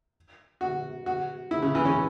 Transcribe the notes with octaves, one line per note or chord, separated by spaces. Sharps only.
F#4
F#4
E4
C#3
E3
C#4